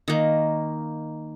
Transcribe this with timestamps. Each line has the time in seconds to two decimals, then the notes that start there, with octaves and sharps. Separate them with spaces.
0.08 D#3 A#3